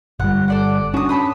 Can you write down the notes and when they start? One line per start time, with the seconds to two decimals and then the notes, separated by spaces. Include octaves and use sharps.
0.20 G1 G3 F#5
0.48 A4 D5 F#5
0.94 C#4 D4 F#4 D#6
1.09 A5 B5 D#6